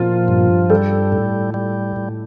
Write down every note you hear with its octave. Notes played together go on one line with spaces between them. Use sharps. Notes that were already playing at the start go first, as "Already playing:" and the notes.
Already playing: A#2 F3 F4
G2
G3 A4
A2
G3
A2